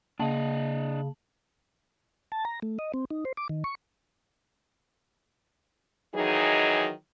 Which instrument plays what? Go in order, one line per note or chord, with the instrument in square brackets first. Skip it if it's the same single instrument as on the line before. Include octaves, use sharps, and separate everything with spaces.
[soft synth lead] C#3 [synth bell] A#3 A5 F#7 [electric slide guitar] D4 D#5
[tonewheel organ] A5
A#5
A3
D#5
C4
D#4
C5
D6
D#3
C#6
[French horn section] D#3 E3 F#3 D#4 G#4 D#5